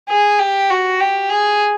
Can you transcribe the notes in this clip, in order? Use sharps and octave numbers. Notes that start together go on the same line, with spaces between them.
G#4
G4
F#4
G4
G#4